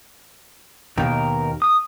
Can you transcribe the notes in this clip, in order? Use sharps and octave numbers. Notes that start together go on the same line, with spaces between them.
D#2 B2 D#3 A#4
D#6